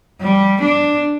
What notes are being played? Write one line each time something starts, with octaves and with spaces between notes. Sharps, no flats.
G3
D4